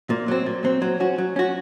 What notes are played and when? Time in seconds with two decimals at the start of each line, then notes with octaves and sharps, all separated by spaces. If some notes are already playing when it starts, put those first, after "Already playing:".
0.10 A#2
0.28 F#3 C4
0.46 A#2
0.64 F#3 C4
0.82 F#3
1.00 C#4 F#4
1.18 F#3
1.36 C#4 F#4